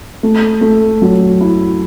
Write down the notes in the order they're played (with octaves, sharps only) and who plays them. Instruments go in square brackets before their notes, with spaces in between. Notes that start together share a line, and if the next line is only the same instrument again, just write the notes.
[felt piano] A3
A3
F#3
E4